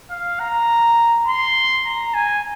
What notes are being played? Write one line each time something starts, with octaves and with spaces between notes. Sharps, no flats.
F5
A#5
C6
A#5
G#5